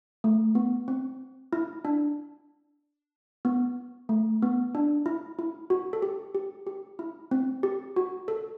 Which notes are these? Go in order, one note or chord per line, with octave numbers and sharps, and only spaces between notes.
A3
B3
C4
E4
D4
B3
A3
B3
D4
E4
E4
F#4
A4
G4
G4
G4
E4
C4
G4
F#4
A4